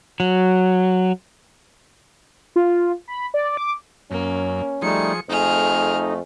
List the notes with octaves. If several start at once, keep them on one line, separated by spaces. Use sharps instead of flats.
F#3
F4
B5
D5
D6
F#2 A#3 C#4
F3 G3 A3 D#4 G#4 C#7
F2 A3 D#4 G#4 F6